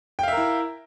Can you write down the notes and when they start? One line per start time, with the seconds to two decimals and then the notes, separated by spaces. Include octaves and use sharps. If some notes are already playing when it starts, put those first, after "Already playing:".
0.19 G5
0.23 F5
0.28 E5
0.32 A#4
0.37 E4